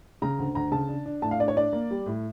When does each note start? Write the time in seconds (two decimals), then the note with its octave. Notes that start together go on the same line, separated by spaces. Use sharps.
0.22 C#3 A#5
0.39 D2
0.55 D2 A#5
0.72 C#3 A5
0.88 D4
1.06 D4
1.22 A2 A5
1.31 F5
1.40 D4 D5
1.48 C#5
1.56 D4 D5
1.73 A#3
1.91 G3
2.06 A2